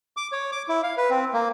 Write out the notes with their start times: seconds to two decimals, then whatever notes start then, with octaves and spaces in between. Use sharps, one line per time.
0.17 D6
0.32 C#5
0.52 D6
0.69 E4
0.83 F5
0.98 B4
1.10 C4
1.34 A#3